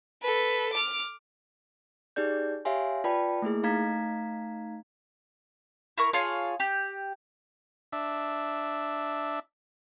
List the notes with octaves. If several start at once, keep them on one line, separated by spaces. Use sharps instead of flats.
A4 B4
D6 F6
D#4 G4 G#4 D5 G6
G4 C#5 E5 F5 G#5 C6
F4 B4 D5 G5 A5 B5
A3 A#3 E4 G#4
A3 D#4 F5 A#5 G#6 B6
E4 A#4 C#6
F4 G#4 C#5 A5
G4
D4 E5